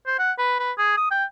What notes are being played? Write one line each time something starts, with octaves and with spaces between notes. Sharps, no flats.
C5
F#5
B4
B4
G#4
D#6
G5